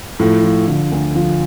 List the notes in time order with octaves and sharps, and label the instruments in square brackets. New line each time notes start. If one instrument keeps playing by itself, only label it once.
[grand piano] A2 [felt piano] F3
[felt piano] F3
D3
D2
F3